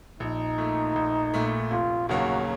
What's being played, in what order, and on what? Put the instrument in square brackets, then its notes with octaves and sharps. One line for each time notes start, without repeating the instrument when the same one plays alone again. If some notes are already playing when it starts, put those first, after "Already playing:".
[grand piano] A#1 [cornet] D#4
[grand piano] A#2 A3
A#1
A#2 A3
[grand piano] F1 [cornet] F4
[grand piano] D#2 C#3 F#3 A#3 [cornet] F#4